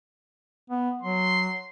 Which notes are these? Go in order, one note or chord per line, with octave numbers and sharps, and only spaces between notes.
B3
F#3 C6